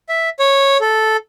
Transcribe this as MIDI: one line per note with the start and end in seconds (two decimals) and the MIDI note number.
0.09 0.29 76
0.39 0.78 73
0.81 1.17 69